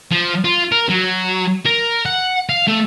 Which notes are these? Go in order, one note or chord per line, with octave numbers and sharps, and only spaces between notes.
F3
F4
A#4
F#3
A#4
F#5
F5
A3